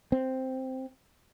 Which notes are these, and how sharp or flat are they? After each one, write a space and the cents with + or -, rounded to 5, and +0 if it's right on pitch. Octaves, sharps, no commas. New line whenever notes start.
C4 +0